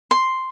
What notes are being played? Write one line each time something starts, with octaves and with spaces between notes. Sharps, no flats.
C6